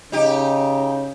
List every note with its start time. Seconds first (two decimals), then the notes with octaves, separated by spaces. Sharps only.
0.12 C#3 D#4 G4